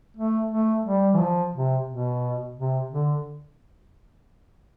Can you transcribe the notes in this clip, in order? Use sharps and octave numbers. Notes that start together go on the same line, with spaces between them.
A3
A3
G3
E3
F3
C3
B2
C3
D3